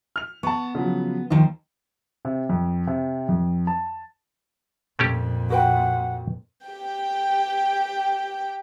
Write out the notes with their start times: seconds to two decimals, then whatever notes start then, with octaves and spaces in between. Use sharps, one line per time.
0.16 F6 F7
0.43 B3 A5 C#6
0.75 C#3 F3 F#3
1.30 D#2 D#3 F3 C5
2.25 C3
2.49 F2
2.87 C3
3.29 F2
3.67 A5
4.99 F2 A#2 A3 C#4 G4
5.50 F#4 B4 F#5 G5
6.66 G4 G5